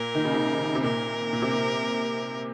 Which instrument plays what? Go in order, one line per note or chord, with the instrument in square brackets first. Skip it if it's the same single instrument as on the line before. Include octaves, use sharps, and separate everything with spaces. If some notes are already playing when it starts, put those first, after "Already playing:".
Already playing: [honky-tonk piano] A#2 [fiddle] A#4
[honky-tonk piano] D#3
C#3
C3
C3
[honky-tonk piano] A#2 [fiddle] A#4
[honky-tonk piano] A#2
C3
A#2